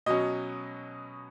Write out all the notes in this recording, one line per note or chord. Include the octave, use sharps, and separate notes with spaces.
B2 F#3 C#4 D#5